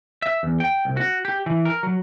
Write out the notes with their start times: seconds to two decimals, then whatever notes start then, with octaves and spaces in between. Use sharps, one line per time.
0.22 E5
0.43 E2
0.60 G5
0.85 C2
0.97 F#4
1.25 G4
1.46 E3
1.65 A#4
1.83 F#3